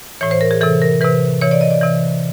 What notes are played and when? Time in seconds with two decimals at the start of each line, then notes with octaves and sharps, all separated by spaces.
0.21 A2 E3 C#5
0.31 C5
0.41 A#4
0.51 G#4
0.61 C3 E3 A4
0.82 A#4
1.01 C3 E3 B4
1.41 C3 E3 C#5
1.51 D5
1.61 D#5
1.70 D5
1.81 C3 E3